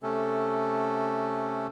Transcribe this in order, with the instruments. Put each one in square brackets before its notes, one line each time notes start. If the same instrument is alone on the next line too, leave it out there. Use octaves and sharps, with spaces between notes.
[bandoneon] C3 A3 C#4 A4